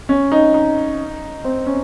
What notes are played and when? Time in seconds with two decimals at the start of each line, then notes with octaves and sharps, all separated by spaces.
0.09 C#4
0.32 D#4
0.54 D#4
1.44 C4
1.66 C#4